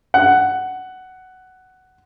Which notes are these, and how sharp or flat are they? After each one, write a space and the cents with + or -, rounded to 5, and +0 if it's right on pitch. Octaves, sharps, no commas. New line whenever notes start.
F#5 +10